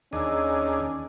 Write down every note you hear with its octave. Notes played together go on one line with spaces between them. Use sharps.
D#2 C#4 D4 G#4 D#5 E6